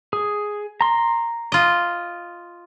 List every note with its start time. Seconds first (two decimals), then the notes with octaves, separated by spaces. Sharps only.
0.13 G#4
0.81 A#5 C6
1.52 F4 D#5